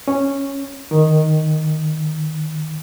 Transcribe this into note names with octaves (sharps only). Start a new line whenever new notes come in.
C#4
D#3